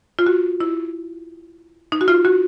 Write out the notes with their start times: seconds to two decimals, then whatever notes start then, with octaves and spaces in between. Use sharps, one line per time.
0.19 F4
0.26 F#4
0.60 E4
1.92 D#4
2.01 F#4
2.08 F4
2.25 F#4